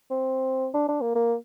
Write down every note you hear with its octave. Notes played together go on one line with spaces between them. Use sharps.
C4
D4
D4
A#3
A#3